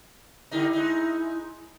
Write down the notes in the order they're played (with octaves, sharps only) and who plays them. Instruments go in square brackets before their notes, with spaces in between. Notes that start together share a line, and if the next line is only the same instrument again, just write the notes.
[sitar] D3 G3 D#4 [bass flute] E4
[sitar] G#3 D#4